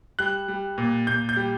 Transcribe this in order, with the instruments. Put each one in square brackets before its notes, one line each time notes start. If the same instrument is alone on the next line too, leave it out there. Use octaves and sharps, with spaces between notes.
[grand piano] G3 F#6
G3
A#2
A#2 G6
G6
G3